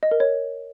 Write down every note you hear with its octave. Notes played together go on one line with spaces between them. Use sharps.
D#5
A#4
C#5